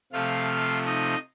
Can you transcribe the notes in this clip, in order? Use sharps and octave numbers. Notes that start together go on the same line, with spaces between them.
C3 F3 A3 F4 F5
D#4 D#5